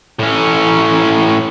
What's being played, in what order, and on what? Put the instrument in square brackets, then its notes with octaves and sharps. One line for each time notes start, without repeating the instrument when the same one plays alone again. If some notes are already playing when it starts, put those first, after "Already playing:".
[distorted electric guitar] A2 C#4